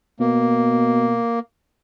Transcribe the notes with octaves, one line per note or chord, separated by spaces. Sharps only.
B2 A#3